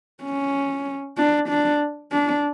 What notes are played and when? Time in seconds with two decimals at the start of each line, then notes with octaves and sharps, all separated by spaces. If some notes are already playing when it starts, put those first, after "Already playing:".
0.24 C#4
1.18 D4
1.49 D4
2.12 D4